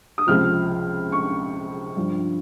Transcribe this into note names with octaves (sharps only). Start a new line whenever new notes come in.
D#6
C#2 C3 F3 F6
C#6
G2 F3